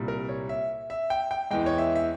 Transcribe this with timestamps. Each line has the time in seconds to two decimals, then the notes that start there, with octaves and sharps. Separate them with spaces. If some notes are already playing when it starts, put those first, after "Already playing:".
Already playing: C2 A#2 G3
0.08 A#4
0.29 C#5
0.49 E5
0.90 E5
1.10 G5
1.31 G5
1.51 E2 E3 G#3 G5
1.66 C#5
1.78 E5
1.96 E5